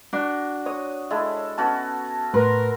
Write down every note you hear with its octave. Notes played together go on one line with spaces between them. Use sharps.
D4 F#4
C#5 D#6
G#3 E4 A4
B3 C#4 F#4 A5
A2 A#4 B4 C6